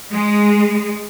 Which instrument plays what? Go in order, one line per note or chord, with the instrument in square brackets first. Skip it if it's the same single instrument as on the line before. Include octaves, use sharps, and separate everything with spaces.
[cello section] G#3